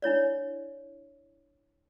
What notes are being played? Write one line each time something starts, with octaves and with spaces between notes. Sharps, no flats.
D4 E4 C#5 D5